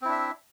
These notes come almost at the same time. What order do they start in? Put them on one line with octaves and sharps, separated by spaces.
C4 E4 D4 E5